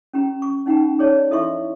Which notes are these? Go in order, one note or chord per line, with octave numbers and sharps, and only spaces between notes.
C#4 G4 A#5
C#6
C#4 D#4 F#5 G5 A#5
G#4 C#5 D5 A5
E4 A4 D#5 E5 C6 C#6